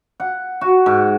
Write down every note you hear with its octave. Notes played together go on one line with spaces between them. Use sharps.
F#5
F#4
G#2